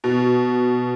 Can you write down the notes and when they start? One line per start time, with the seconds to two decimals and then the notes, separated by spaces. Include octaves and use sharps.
0.04 B2